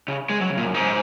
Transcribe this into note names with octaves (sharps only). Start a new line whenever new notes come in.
C#3
G#3
F#3
C#3
A#2
F#2
G#2